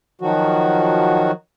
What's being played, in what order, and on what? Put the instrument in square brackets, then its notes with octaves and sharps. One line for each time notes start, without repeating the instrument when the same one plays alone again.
[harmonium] D#3 F3 F#3 F#4